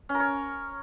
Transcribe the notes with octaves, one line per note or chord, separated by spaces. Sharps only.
C#4
A#4
C#5